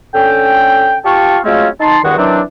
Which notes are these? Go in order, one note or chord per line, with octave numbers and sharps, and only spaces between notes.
D3 C#4 A4 G5
F4 G4 F5 A5 C#6
F#3 G#3 A3 C4 C#4 F4
D#4 A5 C6
E2 G2 D#3 G#3 F#4 F#5
D#3 E3 F#3 C4 D4